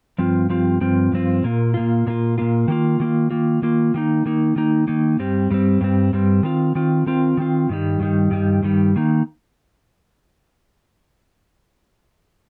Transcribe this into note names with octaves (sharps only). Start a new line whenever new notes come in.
G2 F3 C4 F4
G2 F3 C4 F4
G2 F3 C4 F4
G2 F3 C4 F4
A#2 A#3 F4
A#2 A#3 F4
A#2 A#3 F4
A#2 A#3 F4
D#3 A#3 F4
D#3 A#3 F4
D#3 A#3 F4
D#3 A#3 F4
D#3 A#3 D#4
D#3 A#3 D#4
D#3 A#3 D#4
D#3 A#3 D#4
G2 G3 C4
G2 G3 C4
G2 G3 C4
G2 G3 C4
D#3 C4 F4
D#3 C4 F4
D#3 C4 F4
D#3 C4 F4
G2 D#3 G3
G2 D#3 G3
G2 D#3 G3
G2 D#3 G3
D#3 A#3 D#4